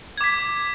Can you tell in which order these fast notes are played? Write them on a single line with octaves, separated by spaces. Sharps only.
G#6 D6 B6